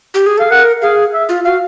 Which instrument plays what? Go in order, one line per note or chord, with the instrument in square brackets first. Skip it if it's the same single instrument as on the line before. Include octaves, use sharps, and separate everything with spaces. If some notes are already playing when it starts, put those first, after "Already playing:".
[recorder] G4
G#4
[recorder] A4 [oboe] F5
[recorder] A#4 [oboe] F#5
[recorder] G#4 [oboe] F5
[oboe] E5
[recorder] F4
[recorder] F#4 [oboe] F5